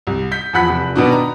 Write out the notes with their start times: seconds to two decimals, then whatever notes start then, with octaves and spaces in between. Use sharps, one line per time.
0.07 C2
0.31 G6 B6
0.53 E2 F3 F#5 B5 F#6 B6
0.70 F1
0.95 B2 D#3 B3 D4 F#4
1.12 A#5